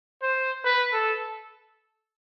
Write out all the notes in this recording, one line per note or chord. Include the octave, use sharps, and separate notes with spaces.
C5
B4
A4